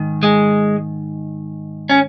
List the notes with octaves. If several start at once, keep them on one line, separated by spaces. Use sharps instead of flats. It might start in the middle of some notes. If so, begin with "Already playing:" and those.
Already playing: G#2 D#3
G#3
C#4